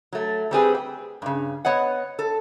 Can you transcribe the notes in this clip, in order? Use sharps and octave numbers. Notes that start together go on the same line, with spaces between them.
F#3 A3
G3 C4 G#4 B4
G5
G2 C#3
B3 C#5 D#5 F#5
A4